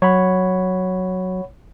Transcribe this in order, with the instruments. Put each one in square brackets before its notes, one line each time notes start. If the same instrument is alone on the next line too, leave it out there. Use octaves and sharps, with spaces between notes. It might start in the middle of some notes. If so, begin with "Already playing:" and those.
[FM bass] F#3 [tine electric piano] C#5 F#5 B5